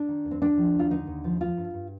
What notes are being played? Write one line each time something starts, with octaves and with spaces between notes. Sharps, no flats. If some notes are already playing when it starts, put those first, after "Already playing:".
Already playing: D4
D#3
D#2
C4
D#2 D4
F3
D#2 F4
D3 D#4
D#2
F3
F3 F4
G2
G2